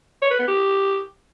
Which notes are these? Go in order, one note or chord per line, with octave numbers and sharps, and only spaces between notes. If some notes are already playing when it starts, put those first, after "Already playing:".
C#5
B4
B3
G4